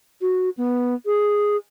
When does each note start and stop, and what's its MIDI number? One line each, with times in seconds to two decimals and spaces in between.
0.21 0.50 66
0.57 0.95 59
1.06 1.57 68